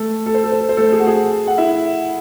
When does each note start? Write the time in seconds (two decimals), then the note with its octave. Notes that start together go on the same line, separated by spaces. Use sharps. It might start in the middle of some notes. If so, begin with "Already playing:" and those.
Already playing: A3 A4
0.26 A4
0.34 C5
0.44 A4
0.52 C5
0.60 A4
0.69 C5
0.77 A3 A4
0.92 G#4
1.00 F#4
1.07 G#4
1.47 F#5
1.58 E4 E5